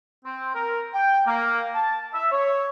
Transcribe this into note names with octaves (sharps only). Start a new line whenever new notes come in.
C4
A#4
G5
A#3
A5
E5
C#5